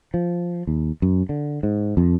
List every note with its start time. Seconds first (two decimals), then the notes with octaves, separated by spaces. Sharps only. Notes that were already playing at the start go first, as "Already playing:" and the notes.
0.14 F3
0.67 D#2
1.02 F#2
1.29 D3
1.63 G#2
1.97 F2